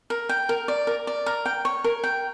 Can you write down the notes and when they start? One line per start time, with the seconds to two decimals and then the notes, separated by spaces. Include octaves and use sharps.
0.10 A#4
0.29 G5
0.49 A#4
0.68 D5
0.87 A#4
1.07 D5
1.26 A#4
1.46 G5
1.65 C#5
1.84 A#4
2.03 G5